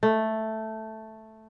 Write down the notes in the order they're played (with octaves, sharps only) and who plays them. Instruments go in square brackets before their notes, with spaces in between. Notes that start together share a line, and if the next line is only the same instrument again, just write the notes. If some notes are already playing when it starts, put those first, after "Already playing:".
[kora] A3